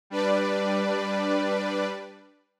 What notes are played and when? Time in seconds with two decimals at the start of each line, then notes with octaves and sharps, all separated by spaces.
0.10 G3 D4 B4 D5